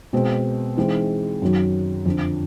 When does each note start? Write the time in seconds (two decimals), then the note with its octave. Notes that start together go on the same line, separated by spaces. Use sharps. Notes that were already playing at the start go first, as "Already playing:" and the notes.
0.13 B2 G#3 C4
0.77 E3 G#3 C4 D#4 G#4
1.42 F#2 D#3 F#3
2.06 F2 D3 F3